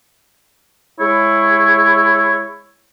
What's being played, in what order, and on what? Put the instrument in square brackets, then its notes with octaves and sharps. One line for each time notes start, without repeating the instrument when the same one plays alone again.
[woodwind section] G#3 E4 C#5